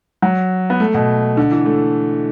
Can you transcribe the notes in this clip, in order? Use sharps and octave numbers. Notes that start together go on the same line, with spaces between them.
F#3
B3
A3
B2
D3
E3
A3